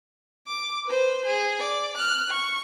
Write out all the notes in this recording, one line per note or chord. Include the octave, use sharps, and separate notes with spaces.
D6
B4 C5
G#4
D5
F6 F#6
C#6